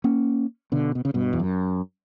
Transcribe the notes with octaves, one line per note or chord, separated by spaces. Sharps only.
A#3 C#4
B2 D3
B2
C#3
G2 B2
E2
F#2